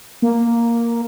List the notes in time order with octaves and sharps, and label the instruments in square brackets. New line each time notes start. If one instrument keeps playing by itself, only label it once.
[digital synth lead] A#3